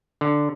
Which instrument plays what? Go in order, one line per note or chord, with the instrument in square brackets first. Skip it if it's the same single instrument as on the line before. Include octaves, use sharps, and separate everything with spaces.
[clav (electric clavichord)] D3